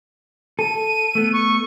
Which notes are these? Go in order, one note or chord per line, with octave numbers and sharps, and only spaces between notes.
A4 D#7
A3 B3
C#6